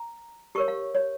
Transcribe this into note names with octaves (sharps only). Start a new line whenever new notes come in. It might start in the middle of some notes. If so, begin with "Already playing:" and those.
Already playing: A#5
G4 A#4 C#5 C#6
F5
C#5